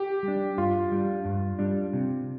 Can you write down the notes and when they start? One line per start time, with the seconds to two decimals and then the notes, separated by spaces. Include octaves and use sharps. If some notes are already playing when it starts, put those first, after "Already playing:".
Already playing: G4
0.23 G3
0.28 D4
0.57 G2 F4
0.92 G3 D4
1.25 G2
1.59 G3 D4
1.93 C3